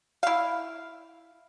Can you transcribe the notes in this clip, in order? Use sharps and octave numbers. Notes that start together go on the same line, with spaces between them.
E4 F5